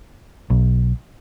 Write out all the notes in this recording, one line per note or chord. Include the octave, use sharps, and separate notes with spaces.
B1